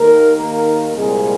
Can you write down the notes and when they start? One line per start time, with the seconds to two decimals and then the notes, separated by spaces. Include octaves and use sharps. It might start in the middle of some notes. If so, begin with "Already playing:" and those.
Already playing: D#2 D#3 A#3 A#4
0.36 A#3 A#4
0.94 C2 A#2 G3 G#3 C4 G#4